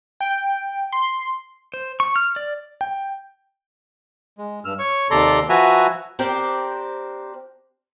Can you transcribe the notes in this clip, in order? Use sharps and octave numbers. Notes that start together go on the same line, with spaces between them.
G5
C6
C5
C#6
F6
D5
G5
G#3
G2 E6 F6
C#5 C#6
D#2 C3 A4 D5 A#5 C6
F3 F#4 B4 E5 G#5 A#5
C4 D4 G4 A#4 C5